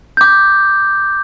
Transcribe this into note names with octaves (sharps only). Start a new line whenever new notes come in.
D6 G6